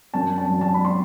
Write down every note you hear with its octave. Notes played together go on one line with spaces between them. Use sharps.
F#2 A5
A5
F#3
A5
B5
C6